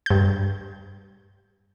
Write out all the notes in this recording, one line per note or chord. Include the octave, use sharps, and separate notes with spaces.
G2 G6